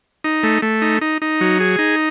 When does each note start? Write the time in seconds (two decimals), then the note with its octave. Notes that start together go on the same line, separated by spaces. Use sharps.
0.24 D#4
0.43 A3
0.62 A3
0.82 D#4
1.01 D#4
1.22 D#4
1.41 F#3
1.60 G#4
1.79 D#4